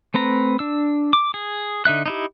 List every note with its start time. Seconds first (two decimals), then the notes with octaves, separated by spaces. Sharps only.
0.14 A3 C4 B4 A#5
0.59 D4 E6
1.13 D6
1.34 G#4
1.85 D3 D#4 E5 F#6
2.06 D#4 E4 G4